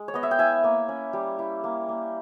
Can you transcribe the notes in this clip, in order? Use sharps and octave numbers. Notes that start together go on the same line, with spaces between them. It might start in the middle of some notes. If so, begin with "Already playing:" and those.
Already playing: G#3
C#5
B3 D#5
E5
G5
E4 E5 G#5
A#3
C#4
G3
E4
A#3
A#3